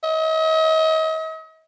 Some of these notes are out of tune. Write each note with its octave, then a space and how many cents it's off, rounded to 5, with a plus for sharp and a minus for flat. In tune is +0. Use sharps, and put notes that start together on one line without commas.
D#5 +40